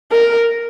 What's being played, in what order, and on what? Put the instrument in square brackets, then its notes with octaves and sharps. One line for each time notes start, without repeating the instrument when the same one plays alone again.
[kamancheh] A#4